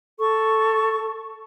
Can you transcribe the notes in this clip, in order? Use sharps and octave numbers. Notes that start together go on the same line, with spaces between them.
A4 C#6